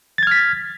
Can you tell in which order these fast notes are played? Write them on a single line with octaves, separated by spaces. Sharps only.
A6 G#6 F6 B6